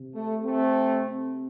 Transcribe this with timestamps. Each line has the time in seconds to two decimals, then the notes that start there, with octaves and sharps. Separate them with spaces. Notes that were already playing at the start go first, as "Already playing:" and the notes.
Already playing: C3
0.15 A3
0.43 A3 C4